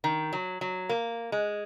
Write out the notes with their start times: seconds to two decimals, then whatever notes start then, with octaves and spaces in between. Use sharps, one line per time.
0.04 D#3
0.33 F#3
0.61 F#3
0.89 A#3
1.32 G#3